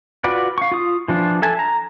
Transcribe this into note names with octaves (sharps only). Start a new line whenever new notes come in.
F4 F#4 B4 D5
F5 C#6
F4 D#6
E3 F3 D4 F4
A4 E5 G#5 A5
A#5